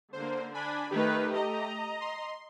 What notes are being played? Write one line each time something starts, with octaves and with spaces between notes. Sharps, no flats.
D3 A#3 C5
D4 G#5 B5
D#3 A3 G4 B4
D#5 A#5
C6